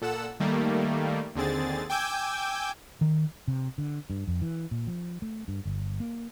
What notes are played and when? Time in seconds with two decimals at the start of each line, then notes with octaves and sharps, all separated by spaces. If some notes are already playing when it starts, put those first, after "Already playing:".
0.02 A#2 A4 F#5 E6
0.40 D#3 G3 A3 A#3
1.35 D#2 D3 C4 G#4 A6
1.90 G5 G#5 D6 E6 G6 G#6
3.01 D#3
3.48 C3
3.78 D3
4.10 G2
4.28 F2
4.42 E3
4.71 A#2
4.87 F3
5.22 A3
5.48 G2
5.65 G1
6.00 A#3